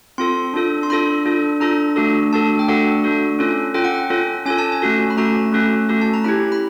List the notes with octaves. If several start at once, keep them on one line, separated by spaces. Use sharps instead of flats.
C4 F4 A4 C6
D4 F4 A4
C6
D4 F4 A4 B5
D4 F4 A4
D4 F4 A4 A#5
A3 D4 F#4 A4
A3 D4 F#4 A4 A5
G5
A3 D4 F#4 A4 F#5
A3 D4 F#4 A4
C#4 F4 A4
C#4 F4 A4 G5
F#5
G5
C#4 F4 A4
C#4 F4 A4 G#5
A5
G#5
A3 C#4 F#4 A4
B5
A3 C#4 F#4 A4 A#5
A3 C#4 F#4 A4
A3 C#4 F#4 A4
A5
A#5
C#4 E4 G4 B5
B5